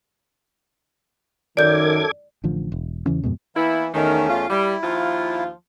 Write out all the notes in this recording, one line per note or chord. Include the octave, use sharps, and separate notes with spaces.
F#2 D#3 A4 D5 D6 G6 G#6
A1 D3 F3
E1
E2 C#3 E3 C#4
F2 G#2 B2
E3 A#3 B3 E4
E2 D#3 A3 C#4
F4
G3 E4
D#2 F3 F4